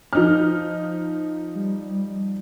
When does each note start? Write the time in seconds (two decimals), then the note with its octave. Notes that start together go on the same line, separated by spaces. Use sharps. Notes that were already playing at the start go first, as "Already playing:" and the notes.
0.13 F3 D#4 F6
1.55 G3